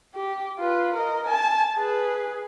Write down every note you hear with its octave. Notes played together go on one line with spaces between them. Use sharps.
G4
F4 B4
A#4 D#5
G#5 A5
G#4 B4